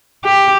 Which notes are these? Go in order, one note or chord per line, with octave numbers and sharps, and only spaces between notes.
G4